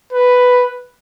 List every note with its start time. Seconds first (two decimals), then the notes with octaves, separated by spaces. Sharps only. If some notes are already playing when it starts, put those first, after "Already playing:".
0.13 B4